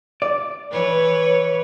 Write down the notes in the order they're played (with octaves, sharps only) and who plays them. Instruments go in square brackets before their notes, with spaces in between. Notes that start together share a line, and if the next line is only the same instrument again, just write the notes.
[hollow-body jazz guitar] D5
[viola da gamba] E3 B4 C#5